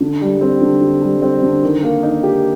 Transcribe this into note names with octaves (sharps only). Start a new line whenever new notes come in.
D3
G3
C4
D3
D3
G3
C4
D3
D#3
A#3
D#4
G4